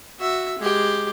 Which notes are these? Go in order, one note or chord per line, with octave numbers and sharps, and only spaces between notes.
F#4 E5
G#3 G4